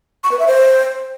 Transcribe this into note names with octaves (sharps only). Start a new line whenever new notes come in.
C#6
B4
E5
C5